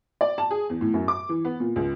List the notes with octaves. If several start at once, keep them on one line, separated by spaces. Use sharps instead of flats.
D5
A5
G#4
E2
A2
F#2
D6
E3
B3
A#2
C#2